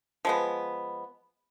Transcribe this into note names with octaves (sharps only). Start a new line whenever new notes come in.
F3 G#3 B3